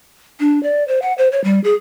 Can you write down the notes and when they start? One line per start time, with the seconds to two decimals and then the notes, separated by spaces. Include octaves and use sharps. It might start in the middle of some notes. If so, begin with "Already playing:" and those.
0.40 D4
0.63 D5
0.88 C5
1.02 F#5
1.18 C5
1.32 C#5
1.44 G3
1.64 G#4